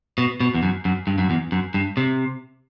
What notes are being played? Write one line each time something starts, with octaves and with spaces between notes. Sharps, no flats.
B2
B2
E2
F#2
F#2
G2
F#2
E2
F#2
G2
C3